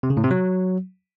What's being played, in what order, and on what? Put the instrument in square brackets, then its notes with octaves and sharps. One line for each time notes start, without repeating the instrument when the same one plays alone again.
[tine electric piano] C3
C#3
A2
C3
F#3